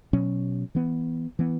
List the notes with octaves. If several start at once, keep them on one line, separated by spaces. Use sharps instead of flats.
B2 F#3 C#4
E3 B3
E3 B3